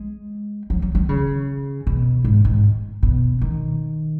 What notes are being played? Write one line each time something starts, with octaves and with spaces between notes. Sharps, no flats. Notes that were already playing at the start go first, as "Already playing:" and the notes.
Already playing: G#3
F#3
F#3
F#3
C#3
B2
G#2
G#2
B2
D#3